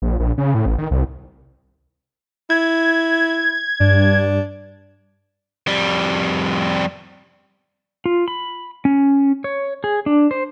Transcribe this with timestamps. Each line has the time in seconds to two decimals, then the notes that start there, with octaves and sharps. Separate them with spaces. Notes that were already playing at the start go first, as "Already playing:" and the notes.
0.02 A#1
0.20 A#1
0.38 C#3
0.54 A2
0.66 A1
0.78 D#3
0.91 C2
2.50 E4 G#6
3.80 G2 D4
5.67 F2 G3
8.06 F4
8.28 B5
8.85 C#4
9.44 C#5
9.84 G#4
10.06 D4
10.31 C5